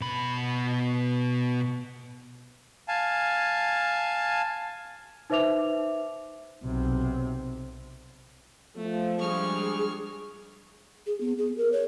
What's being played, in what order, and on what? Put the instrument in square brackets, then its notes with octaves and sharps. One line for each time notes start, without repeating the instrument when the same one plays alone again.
[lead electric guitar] B2 B5
[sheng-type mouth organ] F5 G#5 A5
[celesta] D#4 B4 C5 E5 D6 F7
[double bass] B1 C3
[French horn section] F3 [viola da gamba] A3
[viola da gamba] G3 G#3 D4 [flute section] G#4 [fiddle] C#6 F6
[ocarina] G#4
B3
G#4
A#4
C#5